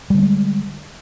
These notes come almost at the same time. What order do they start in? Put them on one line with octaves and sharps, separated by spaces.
G3 D3 A#3 G#3